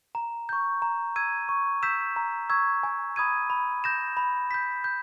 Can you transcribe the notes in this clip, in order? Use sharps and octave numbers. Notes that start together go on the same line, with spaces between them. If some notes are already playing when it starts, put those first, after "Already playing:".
A#5
C#6 G6
A#5
E6 G#6 D#7
C#6
E6 G6 B6 E7
A#5
C#6 E6 G#6
G#5
B5 D#6 G#6 D#7
B5
G6 A#6 E7
B5
G6 B6
G6